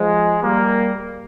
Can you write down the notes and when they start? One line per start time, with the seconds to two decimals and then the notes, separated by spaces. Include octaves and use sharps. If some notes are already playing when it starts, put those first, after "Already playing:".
Already playing: F3 G#3
0.43 G3 A#3